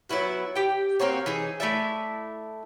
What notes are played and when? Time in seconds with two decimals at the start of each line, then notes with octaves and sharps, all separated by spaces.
0.09 F#3 B3 E4 F#4
0.55 G4 G5
0.99 A#3 C4 F#4 C#5
1.26 E3 D#4 G#4
1.60 A3 E4 D5 E5